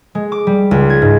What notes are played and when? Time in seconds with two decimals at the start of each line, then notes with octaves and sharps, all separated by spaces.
0.15 G#3
0.32 D6
0.47 G3
0.71 C#2
0.90 G#6
1.02 G#2